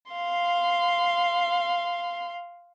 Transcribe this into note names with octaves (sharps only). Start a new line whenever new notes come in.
F5 C6